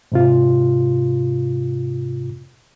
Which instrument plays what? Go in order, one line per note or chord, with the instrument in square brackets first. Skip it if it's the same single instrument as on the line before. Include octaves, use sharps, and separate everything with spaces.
[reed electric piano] G#2 C3 F4